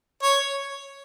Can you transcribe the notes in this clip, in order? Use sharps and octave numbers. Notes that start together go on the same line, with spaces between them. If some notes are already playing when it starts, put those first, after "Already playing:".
C#5